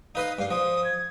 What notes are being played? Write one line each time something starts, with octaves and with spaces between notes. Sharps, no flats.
D#4 B4 D#5 F5
G2 F5
F3 D#6
G#6